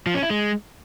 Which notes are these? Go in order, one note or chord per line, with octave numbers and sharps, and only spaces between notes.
F3
C#4
E4
G#3